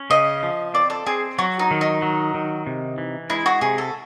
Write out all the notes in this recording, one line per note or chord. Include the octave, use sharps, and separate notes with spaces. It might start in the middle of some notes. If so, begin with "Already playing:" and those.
Already playing: C#4
C#3 D#5
F3
C4 D5
A4
C4 G#4
F#3 F#4
D#4
D#3
D#4
F#3
D#3
C3
E3
G#3 E4
F#4
C3 G#4
A4